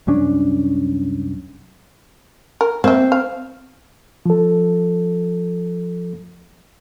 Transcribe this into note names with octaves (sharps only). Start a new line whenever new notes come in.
C2 F#2 C#4 D4
A#4
A#3 C4 E5
F5
F3 A4